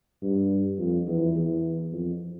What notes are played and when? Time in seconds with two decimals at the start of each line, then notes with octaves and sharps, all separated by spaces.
0.22 G2
0.78 F2
1.07 E2
1.36 E2
1.92 F2